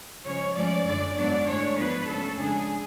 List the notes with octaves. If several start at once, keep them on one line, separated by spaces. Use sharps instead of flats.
C#3 F3 G#3 C#4 C#5
G#2 F3 A3 C#4 D5
F#2 D3 G#3 D5
G#2 F#3 B3 D4 D5
A2 G#3 D4 C#5
G#2 F3 B3 D4 B4
C#3 F#3 A3 C#4 A4
F2 C#3 G#3 D4 G#4